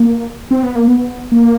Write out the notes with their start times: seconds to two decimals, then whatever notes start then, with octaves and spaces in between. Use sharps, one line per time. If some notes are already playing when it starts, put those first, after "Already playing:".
Already playing: A#3
0.51 C4
0.63 B3
0.75 A#3
0.88 B3
1.32 A#3